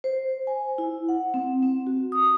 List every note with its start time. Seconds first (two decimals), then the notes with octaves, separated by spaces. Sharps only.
0.04 C5
0.47 G#5
0.78 E4
1.09 F#5
1.34 C4
1.63 C4
1.87 F#4
2.12 D#6